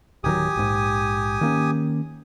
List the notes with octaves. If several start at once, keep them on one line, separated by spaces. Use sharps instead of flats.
D1 D#3 F#3 G4 G#5 D#6
A#1 G#2
D#3 A#3 C#4